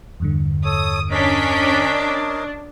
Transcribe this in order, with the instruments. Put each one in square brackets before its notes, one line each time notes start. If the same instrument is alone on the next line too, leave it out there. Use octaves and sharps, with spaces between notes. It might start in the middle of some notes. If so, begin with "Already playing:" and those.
[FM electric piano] E2 G2 D3
[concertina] A4 C#5 [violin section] D#6
[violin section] C#4 B6 D7 [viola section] D4 [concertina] A#4 C#5 D#5